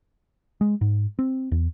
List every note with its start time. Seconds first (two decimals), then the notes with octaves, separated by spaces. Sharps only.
0.61 G#3
0.81 G#2
1.19 C4
1.52 E2